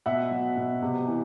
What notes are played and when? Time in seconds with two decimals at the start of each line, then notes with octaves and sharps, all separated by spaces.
0.06 B2 E5 F#5
0.31 F#3
0.57 B2
0.82 C3
1.08 E3